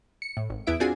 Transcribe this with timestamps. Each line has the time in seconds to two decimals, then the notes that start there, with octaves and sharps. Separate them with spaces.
0.22 C#7
0.37 A2
0.50 G#1
0.67 E2 B3 E4 E5 D7
0.80 C4 D4 F4 F#4 G#4 G#5